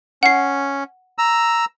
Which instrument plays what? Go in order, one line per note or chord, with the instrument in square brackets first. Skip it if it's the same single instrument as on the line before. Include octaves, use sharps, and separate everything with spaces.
[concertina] C#4 [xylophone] F#5 C7
[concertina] A#5 E6